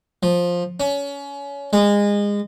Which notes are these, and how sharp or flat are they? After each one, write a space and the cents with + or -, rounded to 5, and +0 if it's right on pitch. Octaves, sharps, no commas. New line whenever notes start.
F3 +10
C#4 +25
G#3 -25